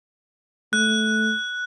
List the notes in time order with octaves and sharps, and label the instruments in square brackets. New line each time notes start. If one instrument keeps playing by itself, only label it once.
[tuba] A3 [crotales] F#6